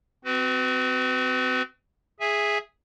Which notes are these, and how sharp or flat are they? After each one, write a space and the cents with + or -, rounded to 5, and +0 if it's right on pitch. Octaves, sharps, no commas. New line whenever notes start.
C4 -30 F#4 +5 B4 +30
G#4 +0 E5 +0 G#5 -15